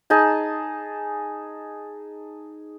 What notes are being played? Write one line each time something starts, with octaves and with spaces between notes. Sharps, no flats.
D#4 G#4 A5